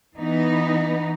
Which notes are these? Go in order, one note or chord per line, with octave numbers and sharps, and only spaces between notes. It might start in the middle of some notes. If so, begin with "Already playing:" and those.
E3 B3 D#4